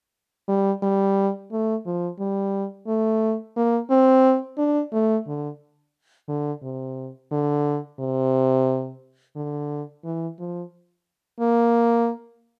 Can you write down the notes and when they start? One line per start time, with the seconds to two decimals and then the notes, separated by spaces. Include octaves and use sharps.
0.48 G3
0.83 G3
1.52 A3
1.86 F3
2.19 G3
2.87 A3
3.56 A#3
3.90 C4
4.58 D4
4.93 A3
5.27 D3
6.28 D3
6.63 C3
7.32 D3
7.99 C3
9.36 D3
10.04 E3
10.39 F3
11.40 A#3